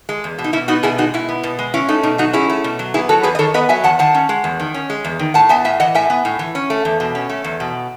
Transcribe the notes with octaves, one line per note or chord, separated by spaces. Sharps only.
G#3
E2
B2
D#4
B2 E4
B3 D#4 F#4
B2 E4 G#4
G#3 D#4 F#4
B2 E4
B3
B2
G#3
C#4 E4
A3 D#4
B2 D#4
F#3 D#4 F#4
C#4 E4 G#4
A3
B2
F#3
B3 E4 G#4
F#3 F#4 A4
E2 G#4 B4
D#5
D#3 A4 C#5
B3 B4 D#5
F#3 E5 G#5
E2 F#5 A5
D#3 F#5 A5
C#4
G#3
E2
D#3
C#4
G#3
E2
D#3
A2 F#5 A5
B3 E5 G#5
A2 E5 G#5
E3 D#5 F#5
A2 E5 G#5
B3
A2
E3
C#4
A3
E2
B2
C#4
A3
E2
B2